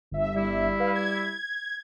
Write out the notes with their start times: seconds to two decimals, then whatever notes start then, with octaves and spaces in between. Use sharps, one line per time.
0.11 G1 E5
0.35 G3 E4
0.80 B4 F5
0.95 G#6